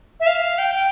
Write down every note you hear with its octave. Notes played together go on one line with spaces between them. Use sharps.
E5
F5
G5
G5